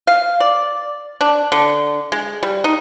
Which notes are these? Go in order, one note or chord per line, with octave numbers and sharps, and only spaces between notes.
F5
D5
D4
D3
G#3
G3
D#4